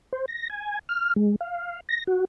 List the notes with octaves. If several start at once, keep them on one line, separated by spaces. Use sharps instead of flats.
C5
A#6
G#5
F6
G#3
F5
A#6
F#4